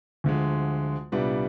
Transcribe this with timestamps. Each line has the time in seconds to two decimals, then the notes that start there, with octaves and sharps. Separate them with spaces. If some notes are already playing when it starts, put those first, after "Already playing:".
0.24 D2 D3 F3 G#3
1.12 C2 A#2 G3 B3 D4